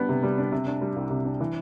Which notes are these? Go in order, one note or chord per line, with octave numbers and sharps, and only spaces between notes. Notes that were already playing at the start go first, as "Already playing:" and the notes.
Already playing: G3 B3 D4
C3
G3
D4
C3
D4
G3
C2
C3
D4
E3